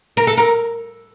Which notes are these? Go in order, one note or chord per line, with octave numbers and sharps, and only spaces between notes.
A#4
A4
A#4